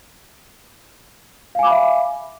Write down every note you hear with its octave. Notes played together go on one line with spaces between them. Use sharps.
E5 F5 G#5 B5 D6